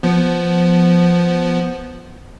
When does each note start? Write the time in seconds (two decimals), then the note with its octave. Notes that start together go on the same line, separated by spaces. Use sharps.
0.03 F3 B3